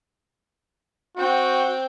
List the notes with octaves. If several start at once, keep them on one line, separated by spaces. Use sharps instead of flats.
C4 F#4 G5